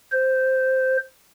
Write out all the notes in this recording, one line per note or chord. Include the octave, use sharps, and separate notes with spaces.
C5